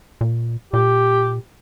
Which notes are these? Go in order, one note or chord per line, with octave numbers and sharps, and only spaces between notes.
A#2
A#2 G4